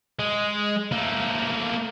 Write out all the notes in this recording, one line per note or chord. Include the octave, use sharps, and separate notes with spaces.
G#3
A3 A#3